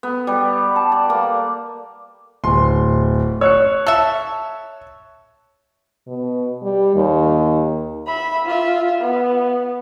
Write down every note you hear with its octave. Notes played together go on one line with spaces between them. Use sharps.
B3
G3
A5
D5
A#3
D1 C6
C#5 E6 F#6 C#7
A4 E5 A5
B2
G3
D#2
E5 B5
F4 E5
B3